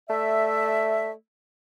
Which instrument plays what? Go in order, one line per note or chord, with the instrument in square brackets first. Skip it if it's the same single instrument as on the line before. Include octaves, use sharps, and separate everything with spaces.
[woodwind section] A3 D5 E5